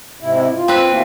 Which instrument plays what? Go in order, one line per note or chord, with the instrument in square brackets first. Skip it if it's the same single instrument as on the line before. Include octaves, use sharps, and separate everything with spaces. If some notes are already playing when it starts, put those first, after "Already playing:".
[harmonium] G#2 C3 E4
F4
[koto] C4 B4
[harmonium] B2 E3 A#3